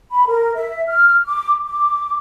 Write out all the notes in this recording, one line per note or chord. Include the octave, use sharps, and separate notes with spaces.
B5
A#4
E5
F6
D6
D6